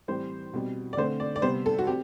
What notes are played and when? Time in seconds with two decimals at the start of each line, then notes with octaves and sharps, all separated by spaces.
0.08 A2 E3 G3 C4 C5
0.54 B2 G3 C4
0.93 D5
0.97 D3 A3 C4 C5
1.20 D5
1.36 D5
1.42 C3 G3 B3 C5
1.66 A4
1.78 F#4
1.87 C4 G4